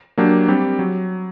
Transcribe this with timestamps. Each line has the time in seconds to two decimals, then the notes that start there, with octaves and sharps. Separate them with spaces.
0.18 F#3 A#3 D4 G4
0.48 G3 C4 G4
0.79 F#3